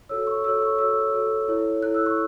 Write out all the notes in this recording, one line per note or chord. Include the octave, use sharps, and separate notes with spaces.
F#4 A4 C#5 E6
C#6
F#4 A4 C#5 E6
C#6
F#4 A4 C#5 E6
F#4 A4 C#5
E4 A4 C#5
E4 A4 C#5 F#6
E6
C#6